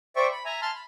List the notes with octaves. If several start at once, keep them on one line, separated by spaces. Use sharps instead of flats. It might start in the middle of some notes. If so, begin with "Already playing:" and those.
C5 D5 E5 G5 C#6
B5
E5 G#5 A#5
A5 C6 F6
B5